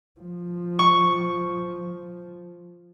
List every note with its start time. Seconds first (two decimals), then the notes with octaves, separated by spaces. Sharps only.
0.20 F3
0.79 C#6